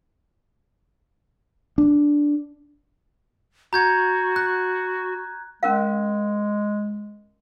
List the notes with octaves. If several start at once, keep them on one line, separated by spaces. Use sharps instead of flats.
D4
F#4 A#5 G6 G#6
F#6
G#3 C#4 A#4 F5